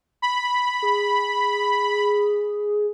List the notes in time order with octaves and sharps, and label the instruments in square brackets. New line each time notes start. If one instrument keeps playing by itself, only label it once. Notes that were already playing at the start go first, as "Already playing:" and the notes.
[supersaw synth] B5
[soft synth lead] G#4